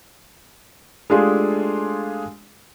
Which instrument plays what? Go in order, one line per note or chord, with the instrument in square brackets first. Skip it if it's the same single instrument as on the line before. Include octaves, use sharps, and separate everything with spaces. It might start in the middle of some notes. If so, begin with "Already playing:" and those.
[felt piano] G#3 A3 D4 F4 G4 G#4